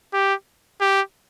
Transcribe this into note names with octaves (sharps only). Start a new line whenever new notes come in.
G4
G4